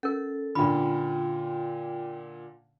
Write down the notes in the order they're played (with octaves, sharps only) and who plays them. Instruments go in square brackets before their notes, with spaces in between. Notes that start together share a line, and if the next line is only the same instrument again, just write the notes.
[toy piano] C#4 A#4 [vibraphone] A4
[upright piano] A#2 D3 [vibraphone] F4 G5 [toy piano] B5